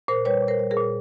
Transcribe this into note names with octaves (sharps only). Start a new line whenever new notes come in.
A#2 A#4 C5
G3 B4 C#5
A#2
A#4 C5
G3
G#4 A#4
A#2